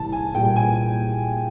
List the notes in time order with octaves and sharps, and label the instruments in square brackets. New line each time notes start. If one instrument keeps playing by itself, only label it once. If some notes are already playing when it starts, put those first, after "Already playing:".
Already playing: [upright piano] C2 A5
G#5
A#2 G3 G5
G#5